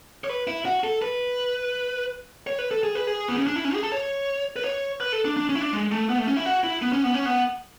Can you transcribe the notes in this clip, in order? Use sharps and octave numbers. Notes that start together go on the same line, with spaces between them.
C#5
B4
E4
F#4
A4
B4
C#5
B4
A4
G#4
B4
G#4
B3
C#4
D4
E4
C#4
G#4
A4
C#5
B4
C#5
B4
A4
D4
D4
C#4
E4
D4
G#3
A3
B3
A3
C#4
E4
F#4
E4
B3
C#4
B3
C#4
B3